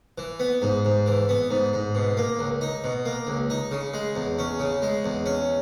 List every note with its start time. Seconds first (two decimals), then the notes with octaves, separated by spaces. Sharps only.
0.18 E3
0.40 B3
0.62 G#2
0.85 G#2
1.06 E3
1.29 B3
1.51 G#2
1.73 G#2
1.95 B2
2.17 A#3
2.39 C#2
2.61 D#4
2.84 B2
3.06 A#3
3.27 C#2
3.50 D#4
3.71 C#3
3.94 G#3
4.15 E2
4.39 C#4
4.59 C#3
4.82 G#3
5.05 E2
5.26 C#4